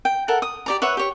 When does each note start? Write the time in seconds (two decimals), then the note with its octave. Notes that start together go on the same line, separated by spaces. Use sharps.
0.05 G5
0.28 A4 A#4 E5 F#5
0.42 D#6
0.66 G4 D5 A#5
0.82 B4 C#5 E5 F#5
0.97 G4 C#5